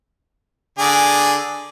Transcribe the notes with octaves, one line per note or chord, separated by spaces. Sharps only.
D3 G#4 D5